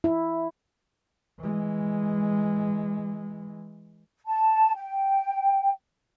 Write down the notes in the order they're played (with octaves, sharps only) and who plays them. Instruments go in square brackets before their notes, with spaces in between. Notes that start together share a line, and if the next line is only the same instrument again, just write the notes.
[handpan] E4
[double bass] E3 G#3
[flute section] A5
G5